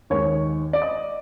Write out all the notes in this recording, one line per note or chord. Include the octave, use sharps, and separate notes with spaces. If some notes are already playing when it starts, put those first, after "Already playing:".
D#2 D#3 G#3 C#5
D5
D#5